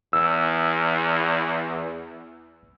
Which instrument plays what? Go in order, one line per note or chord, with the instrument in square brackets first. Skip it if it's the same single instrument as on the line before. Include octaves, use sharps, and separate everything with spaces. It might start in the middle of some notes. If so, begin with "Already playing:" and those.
[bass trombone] E2 [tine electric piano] E6